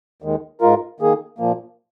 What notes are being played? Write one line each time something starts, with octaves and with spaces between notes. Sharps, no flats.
D#2 D#3 G#3
G#2 G#3 F4 A#4
D#3 A#3 G#4
A#2 F3 A#3